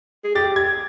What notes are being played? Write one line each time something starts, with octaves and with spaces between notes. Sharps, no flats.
G#4
G4 A6
G#6